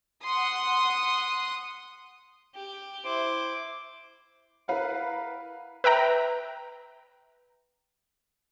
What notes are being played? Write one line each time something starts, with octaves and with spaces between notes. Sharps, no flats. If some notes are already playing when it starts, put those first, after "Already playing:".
F#5 C6 D#6
G4
E4 C5 D6
E4 A#4 B4 F5 F#5
B4 E5 G5 A#5